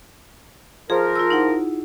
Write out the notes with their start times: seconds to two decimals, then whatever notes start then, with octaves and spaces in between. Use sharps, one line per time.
0.90 F3 G#4 A#4
1.16 F4 E6
1.30 D#4 E4 F#5